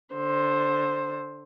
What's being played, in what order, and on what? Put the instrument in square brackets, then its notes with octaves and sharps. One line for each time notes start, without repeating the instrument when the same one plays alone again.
[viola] D3 C5